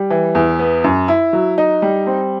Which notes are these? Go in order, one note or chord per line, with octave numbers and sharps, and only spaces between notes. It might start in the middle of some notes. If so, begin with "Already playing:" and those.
Already playing: G3
E3
E2
B3
F#2
E4
F#3
D#4
G3
C4